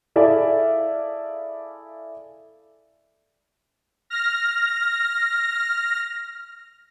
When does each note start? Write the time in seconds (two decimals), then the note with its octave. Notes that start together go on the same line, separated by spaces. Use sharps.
0.16 E4 G#4 A4 D5 E5 F5
4.10 F6 A#6